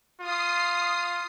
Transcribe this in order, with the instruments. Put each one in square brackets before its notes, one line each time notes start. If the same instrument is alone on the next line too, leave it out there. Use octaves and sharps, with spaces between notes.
[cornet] F4 [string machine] D#6 C7